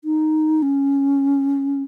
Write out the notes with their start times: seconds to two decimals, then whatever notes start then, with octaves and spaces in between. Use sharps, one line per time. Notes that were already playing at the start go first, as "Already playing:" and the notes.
0.04 D#4
0.62 C#4